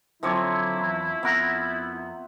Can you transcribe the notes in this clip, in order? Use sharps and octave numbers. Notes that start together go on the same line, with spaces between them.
D3 F3 F#3 C4 E4 C#5
E2
F2 B3 A#4 E5 F#5